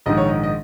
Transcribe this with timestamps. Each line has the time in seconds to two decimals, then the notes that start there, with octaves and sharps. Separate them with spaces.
0.06 A#1 G#2 D#3 D#5
0.17 C#5
0.29 D#5
0.43 D#5